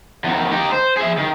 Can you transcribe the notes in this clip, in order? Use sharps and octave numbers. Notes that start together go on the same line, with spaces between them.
E2 D#3
D#4 G4
C5
G#4 E5
D#3